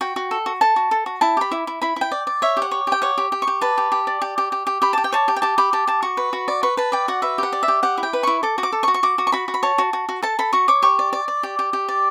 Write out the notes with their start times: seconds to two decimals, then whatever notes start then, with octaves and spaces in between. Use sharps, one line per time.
0.01 F#4 G5
0.16 F#4
0.31 A4
0.46 F#4
0.61 A4 A5
0.76 F#4
0.91 A4
1.06 F#4
1.21 E4 A5
1.37 G4 B5
1.51 E4
1.67 E4
1.82 E4 B5
1.96 E4 G5
2.12 D5
2.27 D5
2.42 C#5 E5
2.57 G4
2.62 F#5
2.71 C#5
2.87 G4 G5
3.02 C#5 F#5
3.18 G4
3.32 G4
3.42 C#6
3.47 G4
3.61 B4 A5
3.78 G4
3.92 G4
4.07 D5
4.22 G4
4.38 G4
4.52 G4
4.67 G4
4.82 G4 B5
4.93 G4 A5
5.04 G5
5.12 C#5 A5
5.28 G4
5.36 G5
5.42 G4 A5
5.58 G4 B5
5.73 G4 A5
5.87 G4 A5
6.03 F#4 C#6
6.17 B4
6.33 F#4
6.48 D5
6.63 B4 C#6
6.77 B4 A5
6.92 D5 G5
7.08 F#4 F#5
7.22 B4 E5
7.38 G4 F#5
7.53 D5
7.63 E5
7.68 G4
7.83 G4 F#5
7.98 E4
8.03 G5
8.13 B4
8.23 E4 C#6
8.43 A4 D6
8.58 F#4
8.63 D6
8.72 A4
8.83 C#6
8.88 F#4
8.94 C#6
9.03 F#4 D6
9.18 F#4
9.27 C#6
9.32 F#4 B5
9.48 F#4
9.54 B5
9.63 C#5 A5
9.78 F#4
9.93 F#4
10.09 F#4
10.22 A4 A5
10.39 A4 B5
10.53 F#4 C#6
10.68 C#5 D6
10.82 G4 C#6
10.99 D5
11.13 D5
11.28 D5
11.43 G4
11.59 G4
11.73 G4
11.89 D5